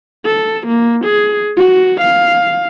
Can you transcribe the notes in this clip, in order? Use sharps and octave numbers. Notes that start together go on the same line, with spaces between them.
A4
A#3
G#4
F#4
F5